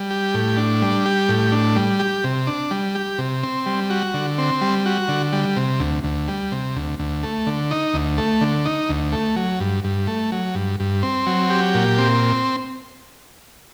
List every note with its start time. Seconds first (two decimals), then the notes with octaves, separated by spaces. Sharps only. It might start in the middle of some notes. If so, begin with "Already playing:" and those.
Already playing: G3
0.10 G4
0.34 A2
0.57 D4
0.82 G3
1.06 G4
1.29 A2
1.52 D4
1.76 G3
1.99 G4
2.24 C3
2.47 D4
2.71 G3
2.95 G4
3.18 C3
3.43 C4
3.66 G3
3.90 F#4
4.14 D3
4.38 C4
4.61 G3
4.86 F#4
5.08 D3
5.33 G3
5.57 C3
5.80 D2
6.04 D2
6.28 G3
6.52 C3
6.76 D2
6.99 D2
7.23 A3
7.47 D3
7.71 D#4
7.94 D2
8.18 A3
8.41 D3
8.65 D#4
8.89 D2
9.12 A3
9.36 F#3
9.60 G2
9.84 G2
10.07 A3
10.32 F#3
10.55 G2
10.80 G2
11.03 C4
11.27 F#3
11.50 G4
11.75 A#2
11.98 C4